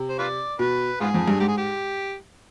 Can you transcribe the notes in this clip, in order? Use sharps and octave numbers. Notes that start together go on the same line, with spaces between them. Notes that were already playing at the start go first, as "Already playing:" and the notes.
Already playing: C3
C5
F4 B4 D5
B2 B4
G#2 B3 F4 G#4
F2
G2
G#2 G4
G#4
G4